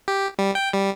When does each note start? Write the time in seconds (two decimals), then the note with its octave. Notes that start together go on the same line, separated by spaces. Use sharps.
0.08 G4
0.39 G3
0.55 G5
0.73 G3